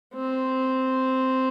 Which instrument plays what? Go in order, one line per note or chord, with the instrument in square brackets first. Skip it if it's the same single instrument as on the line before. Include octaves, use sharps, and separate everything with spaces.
[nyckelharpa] C4